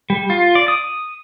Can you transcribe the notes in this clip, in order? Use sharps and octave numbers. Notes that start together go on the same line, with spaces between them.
G3
F4
D5
D#6